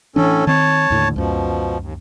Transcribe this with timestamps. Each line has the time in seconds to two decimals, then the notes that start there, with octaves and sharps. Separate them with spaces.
0.16 A2 E3 C#4 D4 A4
0.47 D#3 C4 C#5 A5
0.90 D#2 A2 D3
1.16 C#2 F#2 B2 F3
1.80 D#2